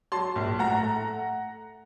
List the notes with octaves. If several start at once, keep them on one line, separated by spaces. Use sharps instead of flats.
F#3 A5 C6
A#1
A2 F#5 A#5
A3